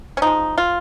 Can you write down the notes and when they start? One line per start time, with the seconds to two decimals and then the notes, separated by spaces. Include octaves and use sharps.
0.17 C#4
0.22 C#3 F3 G#3 D#4
0.58 F4